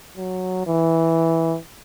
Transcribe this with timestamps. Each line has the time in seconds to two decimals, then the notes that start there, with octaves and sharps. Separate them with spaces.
0.17 F#3
0.67 E3